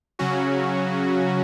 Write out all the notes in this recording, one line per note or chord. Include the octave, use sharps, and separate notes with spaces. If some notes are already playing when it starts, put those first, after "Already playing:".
C#3 F#3 C#4 F#4